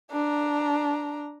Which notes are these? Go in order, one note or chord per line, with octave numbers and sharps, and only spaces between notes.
D4 A#5